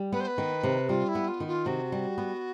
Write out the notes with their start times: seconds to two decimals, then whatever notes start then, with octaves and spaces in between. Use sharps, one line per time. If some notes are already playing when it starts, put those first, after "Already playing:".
Already playing: G3
0.12 B3 B4
0.20 C5
0.27 B4
0.38 D#3
0.63 C3
0.89 G3 F4
1.08 E4
1.15 B3
1.27 F4
1.40 D#3
1.47 F4
1.66 C3 F#4
1.92 G3
2.18 B3